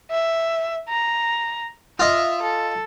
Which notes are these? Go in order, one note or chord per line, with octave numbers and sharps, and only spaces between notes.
E5
A#5
F4 D#5 E5
A4